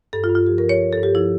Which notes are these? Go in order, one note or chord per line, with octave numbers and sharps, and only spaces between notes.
G2 A4
F4
G2
F4
F3 G4
A#4
F3
C#5
G2
A4
G2
G4
F3 E4